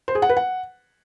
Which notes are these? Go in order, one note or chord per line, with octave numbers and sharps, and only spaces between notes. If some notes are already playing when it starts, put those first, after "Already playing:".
C5
G#4
F#5
B4
F#5